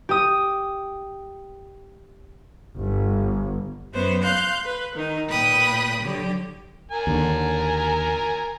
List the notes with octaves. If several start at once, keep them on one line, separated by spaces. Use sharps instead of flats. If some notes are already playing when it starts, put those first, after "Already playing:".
G4 D#6
G1
F#2 B3 B4 C5
F5 C6 F#6 G6
B4
D#3 D#4
A#2 B4 G5 D#6
D3 F#3 G4
A#4 G#5
D#2 D3